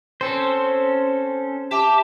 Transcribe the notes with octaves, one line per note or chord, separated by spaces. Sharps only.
C4 C#4 A4 C5
G4 E5 A5 D6